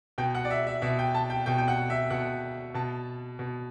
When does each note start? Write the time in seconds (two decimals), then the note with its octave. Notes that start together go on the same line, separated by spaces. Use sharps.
0.18 B2 G5
0.35 F#5
0.45 D5
0.50 E5
0.67 E5
0.82 B2 E5
0.99 G5
1.15 A5
1.30 G5
1.46 B2 G5
1.58 G5
1.68 F#5
1.90 E5
2.10 B2 F#5
2.74 B2 A5
3.39 B2